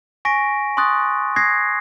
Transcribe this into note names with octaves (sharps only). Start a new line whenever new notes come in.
G#5 C#6 A#6 B6 D7
C6 C#6 D#6 F#6 A6
D#6 F#6 G#6 A#6 C7